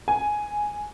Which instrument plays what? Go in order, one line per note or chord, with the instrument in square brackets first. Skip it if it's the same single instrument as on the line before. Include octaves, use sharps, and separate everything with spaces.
[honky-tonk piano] G#5